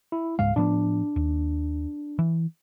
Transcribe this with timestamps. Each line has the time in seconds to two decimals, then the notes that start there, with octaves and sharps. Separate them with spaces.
0.12 E4
0.39 C#2 G#2 G#3 F5
0.56 A2 F3 B3 D4
1.16 D#2
2.19 E3